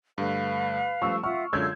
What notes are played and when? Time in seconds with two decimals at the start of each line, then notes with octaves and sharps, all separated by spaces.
0.18 G2 D3 A3 B4 F5
1.02 F3 G3 A3 C#6 E6
1.24 F4 E5 F#5 C#6 F6
1.53 F#2 D3 G#3 F4 C#5 E6 G6 G#6